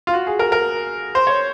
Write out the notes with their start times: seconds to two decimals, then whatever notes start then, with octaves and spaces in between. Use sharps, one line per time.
0.07 F4
0.14 F#4
0.27 G#4
0.39 A#4
0.52 A#4
1.15 C5
1.27 C#5